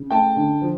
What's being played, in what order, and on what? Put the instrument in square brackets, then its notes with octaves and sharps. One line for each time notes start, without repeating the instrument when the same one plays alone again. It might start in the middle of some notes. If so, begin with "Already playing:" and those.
Already playing: [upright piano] C#3
A3 G5 A5
D3
F3